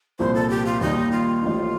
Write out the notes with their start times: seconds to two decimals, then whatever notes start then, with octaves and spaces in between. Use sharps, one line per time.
0.19 C2 A#2 F3 C5
0.34 A4
0.50 G4
0.66 F4
0.81 D#2 D#3 G3 D#4
1.12 F4
1.42 A1 A2 F3 A#3 D#4